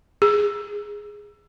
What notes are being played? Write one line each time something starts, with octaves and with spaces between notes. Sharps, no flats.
G#4